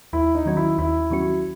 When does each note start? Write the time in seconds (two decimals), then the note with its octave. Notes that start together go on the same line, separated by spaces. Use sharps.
0.13 D#2 E4
0.35 D#4
0.46 D#3 F#3 C#4 F#4
0.57 E4
0.78 D#2 E4
1.10 D#3 F#3 C#4 F#4